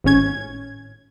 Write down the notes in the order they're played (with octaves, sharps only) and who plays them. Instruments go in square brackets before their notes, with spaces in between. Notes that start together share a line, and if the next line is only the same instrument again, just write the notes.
[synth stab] G#1 A2 C#4 G#6